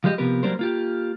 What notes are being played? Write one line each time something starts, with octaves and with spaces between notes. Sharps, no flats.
F3 G3 G#3 G4 C5 D#5
C3 F3 B3 G4 A#4 B4
F#3 G3 A#3 D4 A#4 C5
A#3 F4 G4